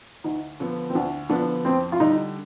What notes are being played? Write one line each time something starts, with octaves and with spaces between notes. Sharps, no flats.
D2 D#4
D3 F3 B3
C4
D2 D4
D3 F3 B3 D4
F2 C4
F4
D3 G3 D#4